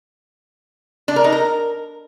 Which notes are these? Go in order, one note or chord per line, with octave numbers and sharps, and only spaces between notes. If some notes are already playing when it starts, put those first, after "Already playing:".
D4
A#4
D#4
A#4